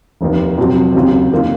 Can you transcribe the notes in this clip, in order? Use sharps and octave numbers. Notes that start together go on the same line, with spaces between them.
F1 D#2 D#3
F2 C3 F#3 C4
D#2 C#3 F#3 C4
F#1 D#3 A#3 F4